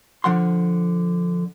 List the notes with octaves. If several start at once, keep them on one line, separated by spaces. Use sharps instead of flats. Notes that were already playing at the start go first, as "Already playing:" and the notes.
D3 F3 F#5 C6